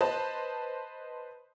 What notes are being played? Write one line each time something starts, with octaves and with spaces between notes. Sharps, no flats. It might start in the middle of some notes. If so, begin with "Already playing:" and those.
B4 C5 D#5 A5